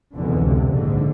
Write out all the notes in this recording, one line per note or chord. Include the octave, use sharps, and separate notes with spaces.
F1 E2 B2 D3
C#2 C3
A#1 G#2 D3